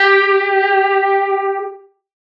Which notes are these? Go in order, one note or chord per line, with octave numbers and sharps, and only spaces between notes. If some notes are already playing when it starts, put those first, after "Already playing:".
Already playing: G4